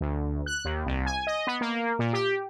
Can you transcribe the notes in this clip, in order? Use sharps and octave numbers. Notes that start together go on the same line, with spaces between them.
D2
F#6
D#2
C2
G#5
D#5
B3
A#3
A#2
G4